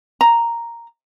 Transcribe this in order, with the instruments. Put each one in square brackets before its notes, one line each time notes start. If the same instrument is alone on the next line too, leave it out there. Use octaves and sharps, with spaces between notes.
[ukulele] A#5